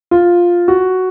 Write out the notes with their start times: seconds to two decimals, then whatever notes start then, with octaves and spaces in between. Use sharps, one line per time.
0.11 F4
0.68 F#4